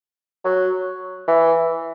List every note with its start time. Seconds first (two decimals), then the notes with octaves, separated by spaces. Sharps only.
0.44 F#3
1.28 E3